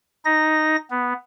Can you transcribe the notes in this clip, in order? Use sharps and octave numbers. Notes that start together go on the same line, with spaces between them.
D#4 A#6
B3